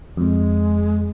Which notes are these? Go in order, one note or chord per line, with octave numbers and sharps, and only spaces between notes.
F2 G#3